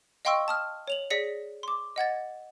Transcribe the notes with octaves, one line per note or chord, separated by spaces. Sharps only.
D#5 F5 G5 C6 C#6 E6
A5 D#6 F6
C#5 F7 F#7
G#4 C#5 D5 A#6 B6 C#7
C6 D6
D#5 F#5 G#6 A6